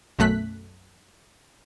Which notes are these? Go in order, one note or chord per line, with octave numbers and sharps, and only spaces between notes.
B1 F#2 A3 F#6 B6